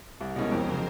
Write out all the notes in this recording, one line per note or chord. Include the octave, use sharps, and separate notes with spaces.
C2 A#4
B2 G#3 C#4 E4
F2 C5
C#3 F#3